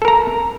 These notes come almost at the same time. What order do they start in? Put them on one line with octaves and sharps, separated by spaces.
A4 A#4 A#5